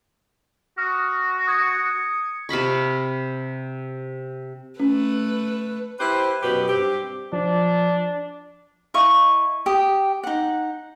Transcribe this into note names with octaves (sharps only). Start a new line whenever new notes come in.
F#4 D#6 F6
D#6 G#6 C#7
C3 F5 B5 C#6
A3 C#4 B4
E4 G4 B4 C5
F#2 B2 F#3 G4 B4
G2 C4 G4
F3 D4
E4 D#5 F5 C#6
G4 D#6
D#4 F#5